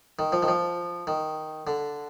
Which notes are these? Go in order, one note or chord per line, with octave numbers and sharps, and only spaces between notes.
D#3
F3
D#3
F3
D#3
D3